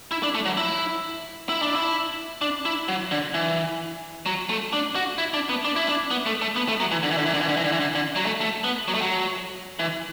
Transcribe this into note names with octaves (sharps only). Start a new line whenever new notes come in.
E4
D4
A3
F#3
E4
E4
D4
E4
D4
E4
F#3
D3
E3
F#3
A3
D4
F#4
E4
D4
B3
D4
E4
D4
B3
A3
A3
B3
A3
F#3
E3
D3
E3
D3
E3
D3
E3
D3
E3
D3
E3
D3
D3
F#3
A3
A3
B3
F#3
A3
F#3
E3